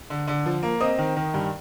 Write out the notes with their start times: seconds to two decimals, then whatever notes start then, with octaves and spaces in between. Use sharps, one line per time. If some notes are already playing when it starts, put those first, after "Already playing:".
0.10 D3
0.27 D3
0.46 F3
0.63 A#3
0.81 C4 D#5
0.98 D#3
1.17 D#3
1.34 G2